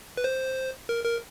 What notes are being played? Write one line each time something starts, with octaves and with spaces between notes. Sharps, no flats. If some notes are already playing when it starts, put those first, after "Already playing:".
B4
C5
A#4
A#4